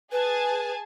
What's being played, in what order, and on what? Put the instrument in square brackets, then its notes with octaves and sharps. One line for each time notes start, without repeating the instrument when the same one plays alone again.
[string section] G#4 G#5 A5 [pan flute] B4